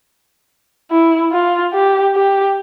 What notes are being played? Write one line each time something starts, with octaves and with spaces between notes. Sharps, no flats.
E4
F4
G4
G4